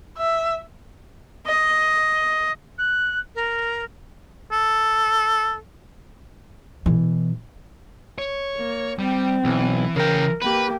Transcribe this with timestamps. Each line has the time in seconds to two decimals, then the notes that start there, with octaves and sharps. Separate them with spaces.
0.18 E5
1.46 D#5
2.78 F#6
3.35 A#4
4.52 A4
6.86 B2 E3
8.18 C#5
8.57 A#3
8.99 G3 C4
9.45 B1 E3
9.96 C#3 A#4 G5
10.42 A#3 G4 B4